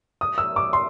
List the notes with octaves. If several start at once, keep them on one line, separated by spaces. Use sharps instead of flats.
D#6
E6
D6
C6